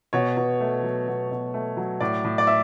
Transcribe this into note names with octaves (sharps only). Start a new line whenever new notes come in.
B2 C#5
B2
A3
F#3
B2
B2
A3
F#3
A2 D5
A2
D5
E5